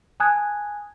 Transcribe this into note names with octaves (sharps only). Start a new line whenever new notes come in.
G#5 A5 D#6 F#6 G#6